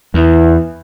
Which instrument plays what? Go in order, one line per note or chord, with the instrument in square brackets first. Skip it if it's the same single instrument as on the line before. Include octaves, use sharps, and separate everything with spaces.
[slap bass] E2 [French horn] E3